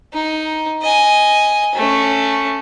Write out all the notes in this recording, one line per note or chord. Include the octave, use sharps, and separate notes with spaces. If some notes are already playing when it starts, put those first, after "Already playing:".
D#4
D#5 G#5
A3 C#4